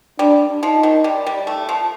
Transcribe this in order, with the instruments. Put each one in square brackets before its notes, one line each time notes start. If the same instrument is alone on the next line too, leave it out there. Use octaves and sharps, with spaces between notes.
[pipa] G3 [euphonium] D4
[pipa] F3 [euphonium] D#4
[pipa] D#3
G3
G3
A3
F3